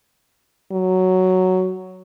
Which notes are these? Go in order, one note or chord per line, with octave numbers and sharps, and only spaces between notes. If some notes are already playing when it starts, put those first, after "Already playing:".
F#3